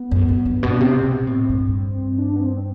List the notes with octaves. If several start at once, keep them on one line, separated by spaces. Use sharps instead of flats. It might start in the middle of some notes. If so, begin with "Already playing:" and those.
Already playing: B3
F#2
F#2
G2
B2
D4
C3 C4
B2
A2
G2
D4
B3
C4
C4